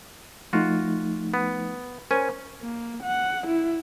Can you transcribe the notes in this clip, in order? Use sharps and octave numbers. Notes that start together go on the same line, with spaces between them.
F3 A3 D#4 F4 F#4
B3
C#4 A#4 C5 G#5
A#3
F#5
E4